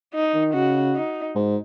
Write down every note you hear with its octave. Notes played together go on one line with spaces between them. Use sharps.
D#4
D#3
C#3 F#4
D#4
G#2